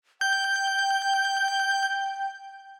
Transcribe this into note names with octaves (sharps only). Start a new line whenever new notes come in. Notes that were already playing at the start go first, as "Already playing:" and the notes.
G5 G6